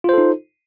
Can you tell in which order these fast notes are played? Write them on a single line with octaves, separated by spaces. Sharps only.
F4 C5 A4 D#4